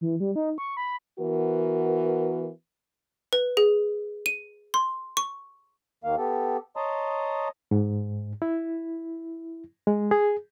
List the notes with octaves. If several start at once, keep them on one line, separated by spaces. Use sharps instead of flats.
E3
G3
D#4
C#6
B5
E3 B3 F#4 A#4
B4
G#4
D#7
C6
C#6
D#2 D#3 A#3 F5
B3 G4 A4
C#5 D#5 A5 A#5 C6 D#6
G#2
E4
G#3
G#4